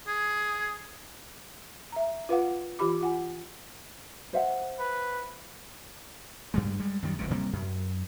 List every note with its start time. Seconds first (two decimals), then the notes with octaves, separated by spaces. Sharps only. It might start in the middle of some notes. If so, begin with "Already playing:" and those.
0.07 G#4
1.92 E5 A#5
2.29 F4 B4 F5 F#5
2.79 E3 F4 G4 B5 D6
3.01 F4 F#5 G#5
4.33 C5 E5 F#5
4.80 B4
6.54 G2 G3 G#3
6.79 G3 G#3
7.02 F#2 D#3 G3
7.18 F1 C#2 F#2 C3
7.31 C3 G3 A#3
7.53 F#2